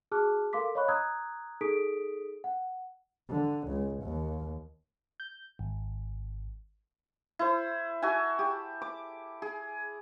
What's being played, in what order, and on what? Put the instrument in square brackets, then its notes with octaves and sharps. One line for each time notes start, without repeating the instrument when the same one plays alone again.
[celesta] F#4 G#4 A5 D6 F6 F#6
A4 A#4 F5 C6 D6 B6
C#5 D#5 F5 B5 C#6 F#6
A#5 C#6 D#6 E6 F#6 G#6
D#4 G#4 A4 D#6 B6 D7
F#5
[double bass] D3
C#2
D#2
[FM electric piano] G6
G#1
[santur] E4 C5
F#4 A4 E5 G#5
G4
D6
G#4